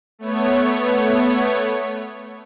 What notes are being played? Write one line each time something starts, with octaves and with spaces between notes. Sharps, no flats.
A3 B3 C#5